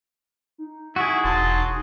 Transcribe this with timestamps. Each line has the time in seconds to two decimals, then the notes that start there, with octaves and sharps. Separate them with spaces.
0.58 D#4
0.96 E4 F#4 G#4
1.24 E1 F#3 A5 C6